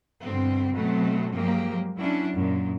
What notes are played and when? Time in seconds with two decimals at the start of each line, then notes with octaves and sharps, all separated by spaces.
0.22 G2 B2 D3 C4
0.73 B2 F#3 A3 C4
1.34 G2 F3 F#3 G#3 A#3 G4
1.98 F#3 C#4 D4 E4
2.34 F#2 A#2